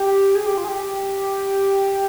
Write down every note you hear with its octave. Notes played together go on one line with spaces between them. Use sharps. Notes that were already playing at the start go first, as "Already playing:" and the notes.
Already playing: G4
G#4
G4
F4
G#4
G4